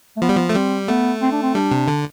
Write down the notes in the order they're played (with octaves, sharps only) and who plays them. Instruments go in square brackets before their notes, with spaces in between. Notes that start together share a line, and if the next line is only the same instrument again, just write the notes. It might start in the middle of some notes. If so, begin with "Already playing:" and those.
[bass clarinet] A3
[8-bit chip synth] F3 [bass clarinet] B3
[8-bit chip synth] G3
F3
A3
[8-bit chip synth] G3 [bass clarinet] C4
[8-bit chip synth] A3 [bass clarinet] B3
[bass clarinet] C4
D4
C4
[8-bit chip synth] G3 [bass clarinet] D4
[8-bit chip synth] C3
D3